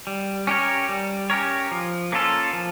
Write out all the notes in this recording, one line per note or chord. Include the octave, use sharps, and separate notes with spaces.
G3
C#4 G4 A#4 C#5
G3
C#4 G4 A#4 C#5
F3
A#3 C#4 F4 A4
F3